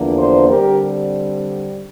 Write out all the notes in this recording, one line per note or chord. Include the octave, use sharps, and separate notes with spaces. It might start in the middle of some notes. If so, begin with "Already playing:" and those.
Already playing: E2 D3 F3 A#3 D4
A4 C5
D3 G3 C4 G4 A#4